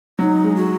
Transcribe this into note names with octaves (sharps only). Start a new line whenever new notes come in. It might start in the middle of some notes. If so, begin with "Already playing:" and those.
F#3 D#4
G#3
F#4